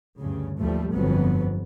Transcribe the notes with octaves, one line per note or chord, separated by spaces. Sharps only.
D2 G2 C#3
A1 D#2 F3 G3 A3
G1 F2 F#3 B3